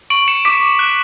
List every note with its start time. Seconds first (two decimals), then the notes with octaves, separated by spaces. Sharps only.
0.10 C#6 D7 F#7
0.28 C#7 E7
0.45 D6 B6 D7
0.79 F#6